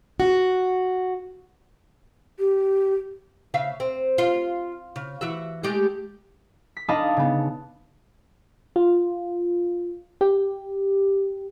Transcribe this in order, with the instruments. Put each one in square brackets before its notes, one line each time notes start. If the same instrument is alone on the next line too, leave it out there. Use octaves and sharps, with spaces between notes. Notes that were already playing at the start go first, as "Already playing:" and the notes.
[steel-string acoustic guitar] F#4
[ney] G4
[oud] C#3 E5 F5
C4
F4
C#3
E3 F#4 E5
G#3 A3 G4
[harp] B6
D4 D#4 D#5 F5 A5 B5
C#3 B3
[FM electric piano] F4
G4